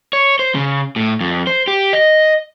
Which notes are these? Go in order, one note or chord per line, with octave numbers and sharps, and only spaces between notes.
C#5
C5
C#3
A2
F2
C5
G4
D#5